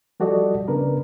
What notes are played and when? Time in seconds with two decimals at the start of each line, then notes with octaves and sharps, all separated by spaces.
0.20 F3 G3 F#4 A4 D5 D#5
0.68 C#3 B3 D4 A#4 B4